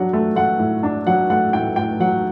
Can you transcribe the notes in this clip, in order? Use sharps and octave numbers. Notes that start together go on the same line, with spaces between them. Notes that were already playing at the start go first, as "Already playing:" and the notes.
Already playing: F#3 D4 F#5
A3
A3 F#5
A2
D4
F#3 F#5
A3 F#5
A2 G5
A2 G5
F#3 F#5